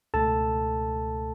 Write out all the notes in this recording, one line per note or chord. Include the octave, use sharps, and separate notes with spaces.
C#2 B2 A3 A4 A5